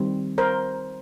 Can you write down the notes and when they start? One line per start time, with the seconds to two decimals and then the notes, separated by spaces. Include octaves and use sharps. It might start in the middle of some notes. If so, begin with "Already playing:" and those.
Already playing: D#3 G3 C4
0.38 A#4 C5